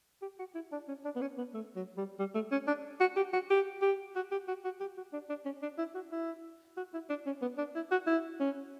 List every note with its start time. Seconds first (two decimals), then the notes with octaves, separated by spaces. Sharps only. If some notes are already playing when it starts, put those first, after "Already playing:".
0.22 G4
0.39 F#4
0.55 E4
0.72 D4
0.88 C#4
1.05 D4
1.16 B3
1.21 C#4
1.38 B3
1.54 A3
1.76 F#3
1.97 G3
2.19 G3
2.35 A3
2.52 C#4
2.67 D4
3.00 F#4
3.16 G4
3.33 F#4
3.50 G4
3.82 G4
4.16 F#4
4.31 G4
4.48 F#4
4.65 F#4
4.81 G4
4.97 F#4
5.13 D4
5.29 D4
5.45 C#4
5.62 D4
5.78 E4
5.95 F#4
6.12 E4
6.77 F#4
6.94 E4
7.09 D4
7.26 C#4
7.42 B3
7.58 D4
7.75 E4
7.91 F#4
8.07 E4
8.40 C#4